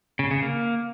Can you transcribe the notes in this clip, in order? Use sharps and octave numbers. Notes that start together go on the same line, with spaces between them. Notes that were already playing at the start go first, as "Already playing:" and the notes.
C#3
C#3
A#3